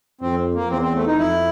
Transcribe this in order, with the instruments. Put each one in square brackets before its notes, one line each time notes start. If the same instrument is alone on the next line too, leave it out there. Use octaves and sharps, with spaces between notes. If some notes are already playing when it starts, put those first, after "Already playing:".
[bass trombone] F2 [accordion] C4
[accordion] A#3
[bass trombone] E2 [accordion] C4
[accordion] C4
A3
D#4
[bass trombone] F2 [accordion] E4